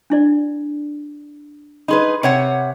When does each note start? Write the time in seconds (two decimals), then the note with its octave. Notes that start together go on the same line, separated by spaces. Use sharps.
0.10 D4 E4 D5
1.88 D#4 G#4 B4 B5 C6
2.23 C3 C#5 F#5